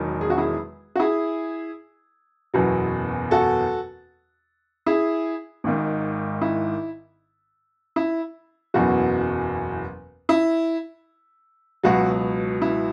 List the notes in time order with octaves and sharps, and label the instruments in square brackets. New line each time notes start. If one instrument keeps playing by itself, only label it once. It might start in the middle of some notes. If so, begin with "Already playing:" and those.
Already playing: [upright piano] E1 E2 D#3 F#3
G#4
F#4
E4 G#4
F#4
E4 G#4
F#1 E2 B2 F#3
F#4 A4
E4 G#4
G#1 G#2 D#3
E4
E4
F#1 E2 B2 F#3 F#4
E4
C#2 B2 F#3 F#4
E4